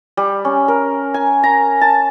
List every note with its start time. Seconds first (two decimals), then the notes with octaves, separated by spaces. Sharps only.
0.17 G3
0.45 C#4
0.68 A#4
1.14 G#5
1.43 A#5
1.81 A5